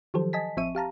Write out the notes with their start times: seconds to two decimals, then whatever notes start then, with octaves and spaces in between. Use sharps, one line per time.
0.14 D#3 F3 F#3 G4 A4 C5
0.33 D#5 G#5 A5 B6
0.57 A1 F3 C4 E5 C#6 D#7
0.75 G4 F5 A5 A#5